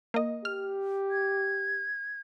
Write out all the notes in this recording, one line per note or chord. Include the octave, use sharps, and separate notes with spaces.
A#3 D#5
G4 F6
G#6